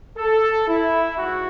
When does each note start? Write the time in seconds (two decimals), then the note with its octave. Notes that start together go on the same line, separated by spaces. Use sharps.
0.18 A4
0.68 E4
1.17 G#2 F#4